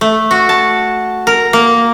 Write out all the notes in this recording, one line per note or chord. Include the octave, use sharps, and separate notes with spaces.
A3
F#4
A5
A#4
A#3